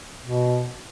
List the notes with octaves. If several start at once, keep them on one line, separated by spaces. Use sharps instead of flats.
B2